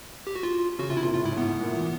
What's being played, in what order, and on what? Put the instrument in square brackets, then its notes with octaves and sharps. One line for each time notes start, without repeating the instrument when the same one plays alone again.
[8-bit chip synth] G4
F#4
F4
[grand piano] C#3 [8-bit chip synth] F#4
[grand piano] C3 [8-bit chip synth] F4
[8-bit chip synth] E4
[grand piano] A#2 [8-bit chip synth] F4
[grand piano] A2 [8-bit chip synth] F4
[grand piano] G#2 [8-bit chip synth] E4
[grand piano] A2
[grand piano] G#2 [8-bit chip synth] B3
[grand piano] A2
A#2
E3